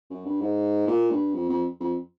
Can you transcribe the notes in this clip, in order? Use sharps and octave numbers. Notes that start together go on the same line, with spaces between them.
F#2
G2
G#2
A#2
G2
F2
F2
F2